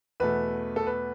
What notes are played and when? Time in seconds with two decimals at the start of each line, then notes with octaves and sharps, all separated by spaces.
0.20 E2 B2 A3 B4
0.76 A4
0.87 B4